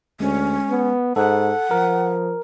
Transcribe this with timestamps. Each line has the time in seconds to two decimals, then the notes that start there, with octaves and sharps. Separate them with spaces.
0.20 D2 G#3 C#4
0.69 B3
1.16 G#2 A4 F#5
1.71 F3 A#4